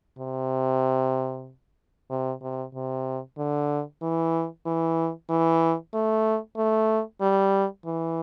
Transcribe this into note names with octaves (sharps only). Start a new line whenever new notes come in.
C3
C3
C3
C3
D3
E3
E3
E3
A3
A3
G3
E3